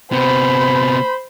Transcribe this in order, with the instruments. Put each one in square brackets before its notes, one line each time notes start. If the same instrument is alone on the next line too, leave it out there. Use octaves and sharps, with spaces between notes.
[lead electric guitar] C3 B3 [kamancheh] C5 B5